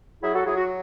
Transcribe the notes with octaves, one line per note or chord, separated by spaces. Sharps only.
F#3 E4 G#4
F#4 A4
F#3 E4 G#4
F#4